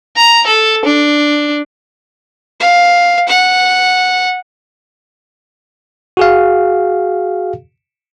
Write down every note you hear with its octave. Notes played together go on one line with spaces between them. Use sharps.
A#5
A4
D4
F5
F#5
F#4 G#4 F5